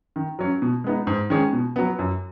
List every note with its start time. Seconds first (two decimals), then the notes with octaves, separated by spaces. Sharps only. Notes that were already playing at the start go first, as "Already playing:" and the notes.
0.16 D#3
0.39 F#3 C#4
0.62 B2
0.84 G#3 B3 D#4
1.07 G#2
1.30 D#3 G#3 C#4 G#4
1.53 B2
1.76 F#3 B3
1.99 F#2